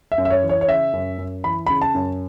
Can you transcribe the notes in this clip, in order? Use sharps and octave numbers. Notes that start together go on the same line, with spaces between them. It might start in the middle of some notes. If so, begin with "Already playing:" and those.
E5
F#2
E5
C#5
E3
C#5
C#5
C#3 E5
F#2
F#2
E3 B5
C#3 B5
A5
F#2